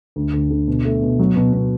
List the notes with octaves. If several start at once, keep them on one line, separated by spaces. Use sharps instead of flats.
D2
D2
D3
B2
A3
B2
F#3
B2
B2